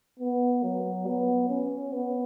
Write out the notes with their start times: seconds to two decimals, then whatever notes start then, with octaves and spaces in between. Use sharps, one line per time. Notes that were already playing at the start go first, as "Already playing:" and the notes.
0.19 B3
0.63 F#3
1.06 B3
1.49 C#4
1.93 B3